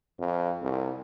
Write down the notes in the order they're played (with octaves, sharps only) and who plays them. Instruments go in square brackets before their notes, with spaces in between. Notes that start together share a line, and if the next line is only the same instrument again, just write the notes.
[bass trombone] F2
C2